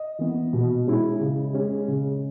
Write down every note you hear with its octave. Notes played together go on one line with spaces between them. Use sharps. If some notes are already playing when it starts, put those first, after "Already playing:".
Already playing: D#5
E3 B3
B2
G#3 C#4 E4
C#3
G#3 C#4
C#3